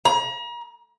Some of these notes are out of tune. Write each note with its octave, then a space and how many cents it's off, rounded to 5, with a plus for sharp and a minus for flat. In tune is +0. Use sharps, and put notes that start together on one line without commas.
A#5 +40